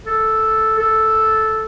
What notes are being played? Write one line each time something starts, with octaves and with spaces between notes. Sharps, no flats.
A4
A4